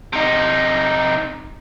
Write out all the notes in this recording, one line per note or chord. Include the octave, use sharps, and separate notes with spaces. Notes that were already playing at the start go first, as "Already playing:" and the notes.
C3 D#4